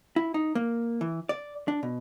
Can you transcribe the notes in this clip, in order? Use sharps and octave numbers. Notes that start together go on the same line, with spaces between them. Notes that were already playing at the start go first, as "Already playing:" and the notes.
E4
D#4
A#3
E3
D5
D4
B2